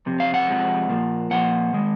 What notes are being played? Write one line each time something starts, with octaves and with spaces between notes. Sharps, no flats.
F2 C3
F5
F#5
F2 C3 F3 G#3
A#2 F3 A#3
A#2 F3 A#3 F#5
D#3 G#3